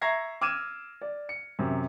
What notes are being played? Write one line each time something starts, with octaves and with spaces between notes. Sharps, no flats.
E5 A#5 C#6 G#6 A#6 C7
D6 E6 F6 G#6 D#7 E7
D5
C#7
F#2 C3